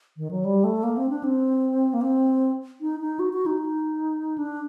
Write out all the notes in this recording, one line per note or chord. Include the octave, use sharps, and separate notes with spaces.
D#3
F#3
G3
A3
A#3
C4
D4
C4
A#3
C4
D#4
D#4
F#4
F#4
D#4
D4